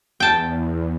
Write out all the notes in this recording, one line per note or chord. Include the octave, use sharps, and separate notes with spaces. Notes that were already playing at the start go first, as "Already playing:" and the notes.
E2 G5 A5